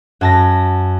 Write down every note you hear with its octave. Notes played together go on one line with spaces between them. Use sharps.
F#2 A5 A#6